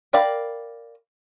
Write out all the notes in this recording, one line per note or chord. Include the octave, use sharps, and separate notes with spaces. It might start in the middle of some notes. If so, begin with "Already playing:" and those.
A#4 D5 F5 G5 B5